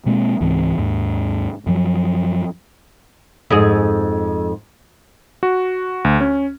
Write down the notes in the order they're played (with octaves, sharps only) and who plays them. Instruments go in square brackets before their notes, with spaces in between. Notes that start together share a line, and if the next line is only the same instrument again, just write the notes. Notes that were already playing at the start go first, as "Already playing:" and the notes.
[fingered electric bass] B2 G#3 A#3 C4
C#2 G#2 E3 C4
D#2 G#2
F#2 F3 F#3
[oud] F2 G#2 G#4
[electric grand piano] F#4
D2
C#4